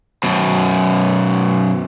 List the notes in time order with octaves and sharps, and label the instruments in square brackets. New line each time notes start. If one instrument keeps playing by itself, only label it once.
[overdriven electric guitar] F#2 B2